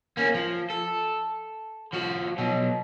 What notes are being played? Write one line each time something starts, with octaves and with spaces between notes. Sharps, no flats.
A#3 C#4
F3
A4
F3 F#4
B2 F#3